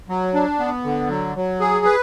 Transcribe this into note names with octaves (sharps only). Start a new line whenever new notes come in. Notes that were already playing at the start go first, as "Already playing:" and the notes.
F#3
D4
B3
D3
F#3
F#3
G#4
B4